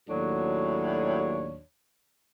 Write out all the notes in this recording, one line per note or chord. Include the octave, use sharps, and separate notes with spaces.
D#2 A2 F#3 D4 F#4 C#5